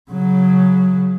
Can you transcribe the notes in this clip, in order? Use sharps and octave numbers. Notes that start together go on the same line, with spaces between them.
C#3 F#3